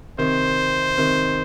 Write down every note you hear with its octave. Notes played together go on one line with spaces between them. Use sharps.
C3 D#3 C5
C3 D#3